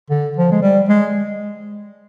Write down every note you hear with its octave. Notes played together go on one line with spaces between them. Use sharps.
D3
F3
G#3
G3
G#3